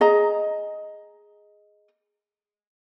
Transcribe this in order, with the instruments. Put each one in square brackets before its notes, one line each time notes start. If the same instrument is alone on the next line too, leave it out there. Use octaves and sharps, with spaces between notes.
[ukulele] G#4 D#5 A#5